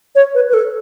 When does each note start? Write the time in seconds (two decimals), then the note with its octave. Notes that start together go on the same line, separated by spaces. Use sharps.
0.15 C#5
0.35 B4
0.49 B4
0.54 A4